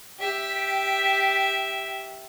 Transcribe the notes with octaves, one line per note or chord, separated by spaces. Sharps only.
G4 E5